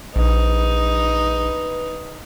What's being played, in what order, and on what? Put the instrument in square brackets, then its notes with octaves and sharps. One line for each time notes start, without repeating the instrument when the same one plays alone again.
[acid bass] A#1 [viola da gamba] D#4 [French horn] B4